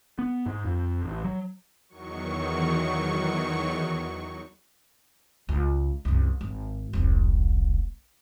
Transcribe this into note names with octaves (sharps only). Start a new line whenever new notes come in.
B3
G#2
F2
A1
F#3
E2 D#3 F#3 C#6
C#2
C2 F#2
G#1
E1 C2